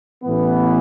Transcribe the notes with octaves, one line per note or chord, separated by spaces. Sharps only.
A1 A2 E3 B3